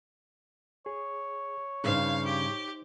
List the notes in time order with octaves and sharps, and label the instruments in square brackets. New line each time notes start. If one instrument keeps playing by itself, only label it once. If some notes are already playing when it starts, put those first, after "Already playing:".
[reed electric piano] G#4 [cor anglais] C#5
[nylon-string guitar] G2 C#3 [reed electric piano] D#4 C5 [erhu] F5
[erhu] G4